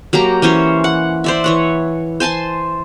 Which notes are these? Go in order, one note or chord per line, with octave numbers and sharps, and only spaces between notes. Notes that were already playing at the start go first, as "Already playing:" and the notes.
F#3 A#3 G4 A#5
E3 C#4 C5 C#5
F#5
C5 D5 E5
E3 C#5 F#5
C5 G#5 A5 C6